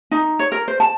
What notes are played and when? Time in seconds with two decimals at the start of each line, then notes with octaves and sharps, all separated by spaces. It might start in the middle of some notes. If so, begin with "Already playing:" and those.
0.11 D#4
0.39 C#5
0.52 A#4
0.68 C5
0.80 A5